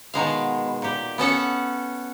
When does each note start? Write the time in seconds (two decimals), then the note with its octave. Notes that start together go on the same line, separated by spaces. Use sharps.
0.14 B2 D#3 G#3 F5
0.82 A#2 G4
1.18 B3 C#4 A4 F#5